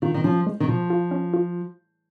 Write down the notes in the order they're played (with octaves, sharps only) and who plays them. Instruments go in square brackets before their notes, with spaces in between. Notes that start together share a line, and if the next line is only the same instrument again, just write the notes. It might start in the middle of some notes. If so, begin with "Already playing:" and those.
[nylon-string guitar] D#3 [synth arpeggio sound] F4
[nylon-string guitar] D#3
[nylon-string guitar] F3 [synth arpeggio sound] C#4
[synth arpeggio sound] G#3
[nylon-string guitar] D#3
[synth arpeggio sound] B2 [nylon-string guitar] F3
[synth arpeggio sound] F4
C#4
F4